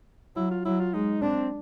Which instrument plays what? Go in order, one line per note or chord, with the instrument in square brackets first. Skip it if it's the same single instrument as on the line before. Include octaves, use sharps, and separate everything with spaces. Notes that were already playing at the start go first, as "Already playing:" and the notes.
[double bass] F#3 [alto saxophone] E4
[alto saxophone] F4
[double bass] F#3 [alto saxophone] E4
[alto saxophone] F4
[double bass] G#3 [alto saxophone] D#4
[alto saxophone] C4 [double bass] D4